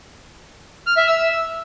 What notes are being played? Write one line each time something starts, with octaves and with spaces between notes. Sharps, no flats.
F6
E5
E6